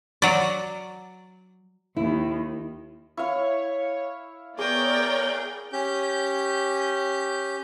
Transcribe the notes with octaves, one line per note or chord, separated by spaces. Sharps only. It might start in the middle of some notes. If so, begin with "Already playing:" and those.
F#3 D5
D#2 D#3 E4
E4 C#5 F5
B3 G#4 A#4 C#5 D5 G5 D6
C#4 G4 G6